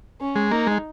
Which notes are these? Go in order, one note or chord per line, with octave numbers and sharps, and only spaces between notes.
C#4
G#3
A#3 D#4
G#3